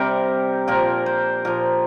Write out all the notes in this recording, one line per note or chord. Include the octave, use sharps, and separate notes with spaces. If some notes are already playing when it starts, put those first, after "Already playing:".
Already playing: C3 G3 D4 G4 A#4
A#2 F3 A#4
C5
A#2 F3 A#4